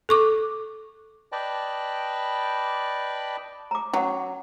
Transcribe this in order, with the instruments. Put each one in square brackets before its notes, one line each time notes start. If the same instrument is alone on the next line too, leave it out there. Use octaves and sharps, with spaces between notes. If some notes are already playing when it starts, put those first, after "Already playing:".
[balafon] A4 C#6 D6
[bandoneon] B4 D5 D#5 G5 A5 B5
[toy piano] A#5 D6
[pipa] F#3 [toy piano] C#4 F#5